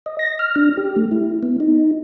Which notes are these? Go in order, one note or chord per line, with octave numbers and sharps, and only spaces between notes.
D#5
A#6
F6
D4
G4
A3
E4
B3
D#4